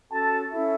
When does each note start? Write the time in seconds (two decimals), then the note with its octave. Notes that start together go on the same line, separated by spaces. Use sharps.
0.11 C#4 F#4 A4 A5
0.51 C#4 E4 A4 E5